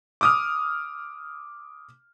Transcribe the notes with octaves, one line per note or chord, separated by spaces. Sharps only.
D6 D#6 F6